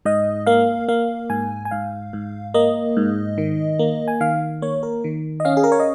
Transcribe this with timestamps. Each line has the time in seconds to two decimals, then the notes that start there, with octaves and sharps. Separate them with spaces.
0.05 G#2 D#5
0.46 A#3 F5
0.88 A#3 F5
1.30 G#2 G#5
1.65 G#5
1.71 G#2 F5
2.13 G#2
2.54 A#3 D#5
2.97 G#2
3.38 D#3
3.79 A#3
4.08 G#5
4.20 D#3 F5
4.62 A#3 C#5
4.83 A#4
5.04 D#3
5.40 D#5
5.45 C#4 F5
5.57 G#4
5.64 A#4
5.72 C#5
5.80 D#5